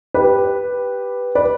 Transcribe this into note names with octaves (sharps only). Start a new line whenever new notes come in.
G4 B4
B4 D5